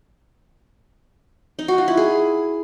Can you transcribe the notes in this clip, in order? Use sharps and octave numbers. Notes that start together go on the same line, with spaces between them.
D#4
F#4
F4
E4
G#4